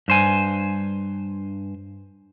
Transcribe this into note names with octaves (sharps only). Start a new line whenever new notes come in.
G2 C5 G#5